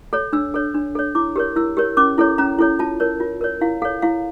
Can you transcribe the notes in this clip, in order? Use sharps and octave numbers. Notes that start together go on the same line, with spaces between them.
A4 C#5
D4 E6
A4 C#5
D4
A4 C#5
E4 D6
G4 A#4 C#5
E4 E6
G4 A#4 C#5
C#4 D6
E4 A4 C#5
C#4 A#5
E4 A4 C#5
F4 A5
A#4 C#5
F4
A#4 C#5
E4 F5
A4 C#5 F5
E4 F5